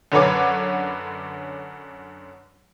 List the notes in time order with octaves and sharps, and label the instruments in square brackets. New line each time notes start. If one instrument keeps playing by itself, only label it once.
[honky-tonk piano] F#2 D3 C#4 B4 C#5 D6